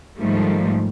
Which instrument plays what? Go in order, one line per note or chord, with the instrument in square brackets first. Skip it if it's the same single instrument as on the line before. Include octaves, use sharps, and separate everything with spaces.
[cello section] G#2 D#3 F3 G3 A3